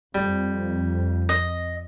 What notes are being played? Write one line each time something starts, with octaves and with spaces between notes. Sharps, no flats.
F2 G3
D#5